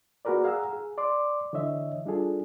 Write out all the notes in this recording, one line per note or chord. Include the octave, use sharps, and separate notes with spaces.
A#3 F#4 G#4 A#4 B4 D5
G#4 F5 F#5 A#5 E6
G#4
D5 C6 D6
D3 E3 C#5 D#5 E5
G3 D4 F4 G#4 A4